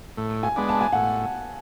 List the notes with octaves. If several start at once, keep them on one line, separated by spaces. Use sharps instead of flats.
A2
G#5
G#3 B3 D4
A5
G#5
A2 F#5